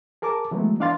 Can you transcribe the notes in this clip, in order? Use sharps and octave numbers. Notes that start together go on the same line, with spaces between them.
G#4 A#4 A5 D6
E3 F#3 G#3 A3 B3
E3 D4 D5 F5 C6 A6